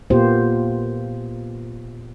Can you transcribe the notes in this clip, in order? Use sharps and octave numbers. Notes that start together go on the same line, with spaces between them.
A#2 A#3 B3 F4 G4 C5